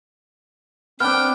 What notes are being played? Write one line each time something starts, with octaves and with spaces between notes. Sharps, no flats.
B3 C4 D4 G5 F6